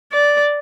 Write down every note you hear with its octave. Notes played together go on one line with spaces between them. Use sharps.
D5